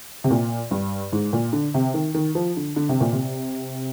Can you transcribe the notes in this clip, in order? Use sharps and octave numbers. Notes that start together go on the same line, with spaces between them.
C3
A#2
G2
G#2
A#2
D3
C3
D#3
D#3
F3
D3
D3
C3
A#2
C3